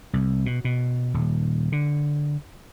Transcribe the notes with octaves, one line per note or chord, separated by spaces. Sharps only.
C2
B2
B2
D#1
D3